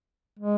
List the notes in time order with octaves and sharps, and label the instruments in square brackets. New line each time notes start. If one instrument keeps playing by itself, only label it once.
[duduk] G#3